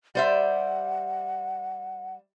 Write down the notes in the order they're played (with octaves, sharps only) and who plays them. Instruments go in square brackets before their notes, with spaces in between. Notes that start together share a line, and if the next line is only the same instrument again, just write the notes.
[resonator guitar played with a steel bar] G3 C5 E5 [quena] F#5